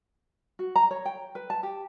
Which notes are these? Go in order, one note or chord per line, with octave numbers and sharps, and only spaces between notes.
F#4
A#5
C#5
G5
B4
A5
G4